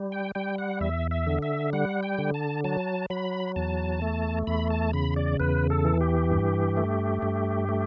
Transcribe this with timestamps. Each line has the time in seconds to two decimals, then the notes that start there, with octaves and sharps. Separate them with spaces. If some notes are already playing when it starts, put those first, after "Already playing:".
Already playing: G3
0.12 G5
0.35 G3 G5
0.58 F#5
0.81 E2 E5
1.11 E5
1.27 D3
1.42 E5
1.73 G3 F#5
2.03 G5
2.18 D3
2.34 A5
2.64 F#3 A5
3.10 F#3 B5
3.56 E2 A5
4.02 A3
4.47 E2 B5
4.70 A5
4.93 C#3 B5
5.16 D5
5.40 E2 B4
5.70 A4
5.85 E3
6.01 G4
6.31 G2
6.77 A3
7.22 G2
7.69 A3